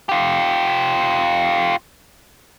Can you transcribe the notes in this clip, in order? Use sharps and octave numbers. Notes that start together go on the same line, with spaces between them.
F4 G4